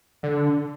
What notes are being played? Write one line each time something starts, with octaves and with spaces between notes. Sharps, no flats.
D3